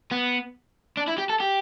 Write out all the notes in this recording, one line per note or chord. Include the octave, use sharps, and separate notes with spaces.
B3
D4
E4
G4
A4
G4